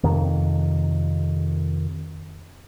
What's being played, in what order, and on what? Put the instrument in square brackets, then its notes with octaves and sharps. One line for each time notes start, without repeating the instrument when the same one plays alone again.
[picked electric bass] F2 C3 D#3